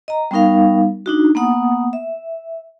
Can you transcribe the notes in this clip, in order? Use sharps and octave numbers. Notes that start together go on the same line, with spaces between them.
D#5 A#5
G3 B3 C#4 D#4 A#4 F5
D4 D#4 F#4
A#3 B3 F#5 D#6
E5